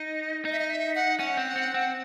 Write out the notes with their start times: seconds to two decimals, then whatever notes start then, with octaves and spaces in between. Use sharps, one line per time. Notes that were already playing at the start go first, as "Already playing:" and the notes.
Already playing: D#4 D#5
0.45 D#4 D#5
0.52 E5
0.59 D#5
0.70 E5
0.95 F#5
1.19 C#4 F#5
1.37 C4
1.56 C4
1.74 C4
1.80 F#5